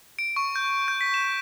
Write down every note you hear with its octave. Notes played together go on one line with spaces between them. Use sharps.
D7
C#6
G6
G6
B6
E7